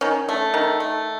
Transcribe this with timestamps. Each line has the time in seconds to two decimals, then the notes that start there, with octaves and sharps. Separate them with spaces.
0.01 D#3 C#4
0.29 A3
0.54 D#3
0.80 A3